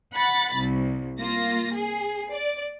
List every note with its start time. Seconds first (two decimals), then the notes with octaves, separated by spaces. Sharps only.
0.15 F#5 B5 A6
0.55 C2
1.19 A#3 F4 A#6
1.74 G#4 C7
2.31 D5